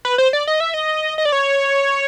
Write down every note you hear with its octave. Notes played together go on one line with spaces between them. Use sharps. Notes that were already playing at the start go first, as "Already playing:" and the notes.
B4
C5
D5
D#5
E5
D#5
D#5
D5
C#5